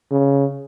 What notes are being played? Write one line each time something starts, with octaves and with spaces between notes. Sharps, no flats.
C#3